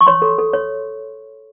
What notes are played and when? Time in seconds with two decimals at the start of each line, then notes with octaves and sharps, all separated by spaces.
0.01 C#6
0.07 C#5 C6
0.22 A4
0.38 A4
0.53 C#5